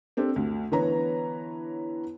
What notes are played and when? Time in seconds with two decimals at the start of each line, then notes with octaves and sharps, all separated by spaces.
0.17 C4 D4 G4 A4
0.36 D2
0.71 D3 E3 B3 B4 C#5 A#5